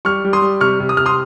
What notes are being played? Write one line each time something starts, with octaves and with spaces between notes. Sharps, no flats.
G3 C#6 F6
G3
C6 D#6
G3
C3 C#6 F6
C3
D#6
C3 F6
C6 D#6